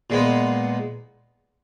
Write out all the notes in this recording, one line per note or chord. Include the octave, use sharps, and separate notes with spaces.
A#2 G#3 B3